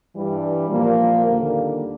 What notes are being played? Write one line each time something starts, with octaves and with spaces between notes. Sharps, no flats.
G2 E3 G3
A#2 F3 A#3
D#2 D3 G3 A#3